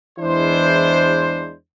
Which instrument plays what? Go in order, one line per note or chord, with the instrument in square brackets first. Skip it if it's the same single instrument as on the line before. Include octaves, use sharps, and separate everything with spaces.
[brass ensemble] E2 E3 G#3 D4 E4 C5